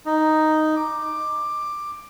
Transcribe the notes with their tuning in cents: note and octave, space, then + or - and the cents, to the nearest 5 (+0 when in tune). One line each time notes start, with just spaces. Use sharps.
D#4 +0
D6 +10